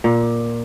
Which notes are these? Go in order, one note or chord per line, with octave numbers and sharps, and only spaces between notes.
A#2